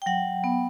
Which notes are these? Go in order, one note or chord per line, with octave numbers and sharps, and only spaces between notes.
G5
F#3 F#5
B3